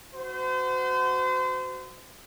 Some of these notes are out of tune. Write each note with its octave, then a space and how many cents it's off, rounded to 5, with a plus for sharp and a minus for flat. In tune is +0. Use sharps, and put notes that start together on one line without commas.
F#4 +0 C5 -35